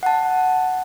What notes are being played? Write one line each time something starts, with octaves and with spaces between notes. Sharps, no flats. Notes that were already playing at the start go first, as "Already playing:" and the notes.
F#5 A5